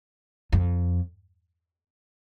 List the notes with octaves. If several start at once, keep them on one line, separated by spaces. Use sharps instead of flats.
F2